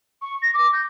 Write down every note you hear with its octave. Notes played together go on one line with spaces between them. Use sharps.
C#6
A#6
D6
G6